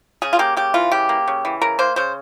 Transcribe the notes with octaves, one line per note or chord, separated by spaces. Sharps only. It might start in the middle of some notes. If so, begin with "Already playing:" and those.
C#3 G#4
F4
A#3 G4
C#3 G4
E3 F4
C#3 G4
A#3
C#3
E3
C#3 A#4
A#3 C5
C#3 C5